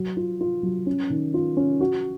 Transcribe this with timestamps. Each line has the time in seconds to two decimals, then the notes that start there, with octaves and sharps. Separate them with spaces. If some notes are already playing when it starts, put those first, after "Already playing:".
Already playing: F#3 F#4
0.17 F4
0.41 F4
0.63 F#3
0.86 C#4
1.10 D#3
1.34 F4
1.57 C#4
1.81 F#4